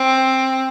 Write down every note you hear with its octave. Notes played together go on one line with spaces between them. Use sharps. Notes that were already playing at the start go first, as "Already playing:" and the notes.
Already playing: C4